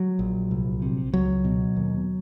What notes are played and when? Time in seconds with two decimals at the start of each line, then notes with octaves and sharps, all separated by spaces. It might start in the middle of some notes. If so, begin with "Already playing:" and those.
Already playing: F#3
0.19 A#1
0.51 C2
0.82 C3
1.13 C#2 F#3
1.44 B2
1.76 D#2